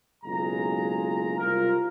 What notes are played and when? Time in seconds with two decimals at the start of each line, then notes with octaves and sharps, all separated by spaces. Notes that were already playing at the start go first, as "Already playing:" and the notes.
0.24 F#1 B1 G#3 F4 A#5
1.39 C2 F4 A#4